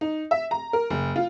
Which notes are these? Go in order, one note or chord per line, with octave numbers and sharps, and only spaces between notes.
D#4
E5
A#5
A#4
F#1
F4